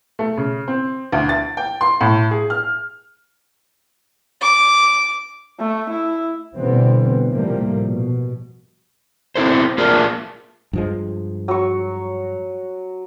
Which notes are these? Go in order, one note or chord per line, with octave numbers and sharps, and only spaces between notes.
A3
C#3
C4
D2
A6
G5
C6
A2
G#4
F6
D6
A3
E4
B2 D3 E3 G3 B3 C4
A2 C3 F3 G3 A3 A#3
B2
C4 E4 A4 C5
A3 A#3 D4 F4 G#4 A#4
G2 F3 G#3
F#3 C#6